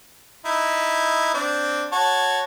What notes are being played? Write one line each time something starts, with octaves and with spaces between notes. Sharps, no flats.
D#4 E4
C4 D4
F#4 C#5 A5